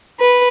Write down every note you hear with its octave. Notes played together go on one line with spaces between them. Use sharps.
B4